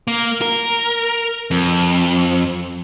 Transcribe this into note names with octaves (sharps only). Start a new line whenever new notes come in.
A#3
A#4
F2